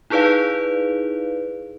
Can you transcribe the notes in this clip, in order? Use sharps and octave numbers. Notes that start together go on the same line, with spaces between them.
D#4 E4 G#4 B4 D5 F5